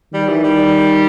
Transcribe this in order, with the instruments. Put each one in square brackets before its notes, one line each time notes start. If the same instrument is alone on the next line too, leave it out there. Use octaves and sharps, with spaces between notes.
[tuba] D#3 [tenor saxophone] G3
[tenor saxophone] E3
G3